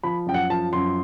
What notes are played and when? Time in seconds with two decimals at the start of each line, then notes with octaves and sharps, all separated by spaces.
0.04 F3 B5
0.26 F#2 G5
0.34 F#5
0.50 F3 A5
0.73 F#2 C6